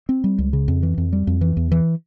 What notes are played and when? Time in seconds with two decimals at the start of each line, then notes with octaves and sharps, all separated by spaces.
0.09 C4
0.24 G3
0.38 C#2
0.53 C#3
0.68 F2
0.83 E3
0.98 F2
1.13 G3
1.27 F2
1.41 E3
1.57 E2
1.72 E3